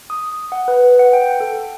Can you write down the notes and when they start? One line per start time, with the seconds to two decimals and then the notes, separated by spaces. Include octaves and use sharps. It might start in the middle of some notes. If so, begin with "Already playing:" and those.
0.10 D#6
0.52 F#5
0.68 B4
0.99 F#5
1.13 G5
1.40 A4